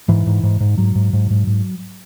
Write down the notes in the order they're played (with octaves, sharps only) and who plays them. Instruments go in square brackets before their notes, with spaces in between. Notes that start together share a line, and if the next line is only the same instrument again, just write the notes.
[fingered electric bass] G#2 E3
G#2
G#2
G#2
G#2 F#3
G#2
G#2
G#2
G#2